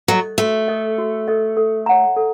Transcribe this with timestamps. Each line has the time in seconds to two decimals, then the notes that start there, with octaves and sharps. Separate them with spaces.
0.08 F#3 A4 D#5
0.38 A3 F#4
0.68 A4 D#5
0.98 F#4
1.28 A4 D#5
1.57 A4
1.86 C#5 F#5 A#5
2.16 A4